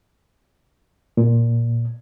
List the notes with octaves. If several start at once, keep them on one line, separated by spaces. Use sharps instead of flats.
A#2